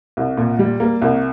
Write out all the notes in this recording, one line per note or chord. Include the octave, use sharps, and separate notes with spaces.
C2
A#2
G3
A#3
C2